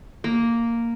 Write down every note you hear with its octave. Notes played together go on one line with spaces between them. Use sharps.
A#3